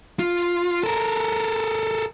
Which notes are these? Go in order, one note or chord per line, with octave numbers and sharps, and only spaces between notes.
F4
A4 A#4